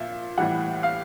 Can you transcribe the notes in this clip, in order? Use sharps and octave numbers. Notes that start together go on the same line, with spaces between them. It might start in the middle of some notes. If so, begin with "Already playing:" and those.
Already playing: A#2 F3 E5
A2 E3 G3 F#5
F5